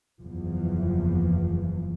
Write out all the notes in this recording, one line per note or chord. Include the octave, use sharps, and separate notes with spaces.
F#1 E2 E3 F3